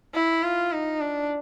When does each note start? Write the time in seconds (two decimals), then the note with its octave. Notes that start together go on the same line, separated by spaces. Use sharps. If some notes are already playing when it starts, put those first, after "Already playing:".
0.15 E4
0.43 F4
0.72 D#4
1.01 D4